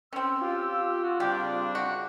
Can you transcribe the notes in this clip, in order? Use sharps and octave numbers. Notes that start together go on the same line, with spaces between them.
C4 C#4 E6
F4 G4
F#4
C#3 G3 C4 D4 G4
F#4